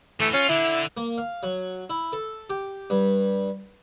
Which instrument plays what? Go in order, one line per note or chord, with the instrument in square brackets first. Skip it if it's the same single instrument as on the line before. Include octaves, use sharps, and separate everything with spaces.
[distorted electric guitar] D3 E3 [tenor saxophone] A3
[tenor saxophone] C#4 [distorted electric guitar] F4
[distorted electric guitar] D3 [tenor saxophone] E4
[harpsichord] A#3
F5
F#3
E4
A4
G4
G2